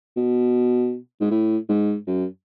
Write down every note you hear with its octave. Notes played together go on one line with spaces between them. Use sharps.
B2
G#2
A2
G#2
F#2